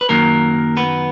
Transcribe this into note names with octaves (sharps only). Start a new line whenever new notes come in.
B4
F#2 D#3 F#3 A#3 A#4
B3 B4